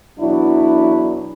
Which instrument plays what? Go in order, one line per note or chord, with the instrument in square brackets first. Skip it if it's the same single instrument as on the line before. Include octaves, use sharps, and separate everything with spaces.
[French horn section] E2 B2 F#3 D4 E4